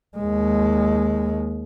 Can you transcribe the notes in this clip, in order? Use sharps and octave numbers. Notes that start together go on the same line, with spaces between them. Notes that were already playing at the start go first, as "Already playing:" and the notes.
D#2 G#3